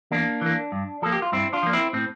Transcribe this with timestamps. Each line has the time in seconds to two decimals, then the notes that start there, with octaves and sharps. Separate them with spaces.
0.11 E2 A#3 D4
0.41 E3 A#3
0.72 G2
1.02 F3 A#3 A4
1.12 G4
1.22 F4
1.32 G2 C4 E4
1.53 D4 F4
1.63 F3 A#3
1.73 C4 E4
1.93 A2 C4